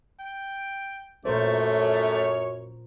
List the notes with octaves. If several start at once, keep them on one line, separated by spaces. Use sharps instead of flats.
G5
F#2 A#2 A3 A#4 C5 C#5